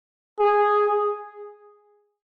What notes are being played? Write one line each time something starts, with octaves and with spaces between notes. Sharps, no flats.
G#4